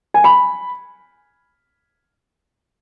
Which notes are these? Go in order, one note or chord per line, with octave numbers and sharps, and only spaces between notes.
G#5
B5